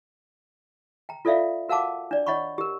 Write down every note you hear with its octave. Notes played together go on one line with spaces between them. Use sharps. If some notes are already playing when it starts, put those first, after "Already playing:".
G5 A#5
F4 A4 D5 E5 F5
F#4 A#4 F5 F#5 A5 D6
D4 D5
C#5 D#5 F#5 B5 C#6
G4 A#4